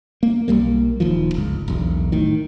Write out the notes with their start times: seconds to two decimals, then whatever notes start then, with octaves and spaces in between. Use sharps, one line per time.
0.23 A#3
0.48 B1 G#2 G3 A#3
1.00 D#1 D#3 F3
1.34 G1 C#2
1.68 E1 B1
2.12 A2 D#3